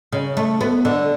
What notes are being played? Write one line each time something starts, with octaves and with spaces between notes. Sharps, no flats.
C#3
A3
B3
D3